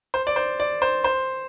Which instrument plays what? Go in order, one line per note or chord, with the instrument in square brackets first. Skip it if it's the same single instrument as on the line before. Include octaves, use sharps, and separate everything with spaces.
[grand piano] C5
D5
C5
D5
C5
C5